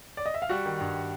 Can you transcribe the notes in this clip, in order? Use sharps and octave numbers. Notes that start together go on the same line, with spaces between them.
D5
D#5
E5
F5
G3 F#4 F#5
D#3
G2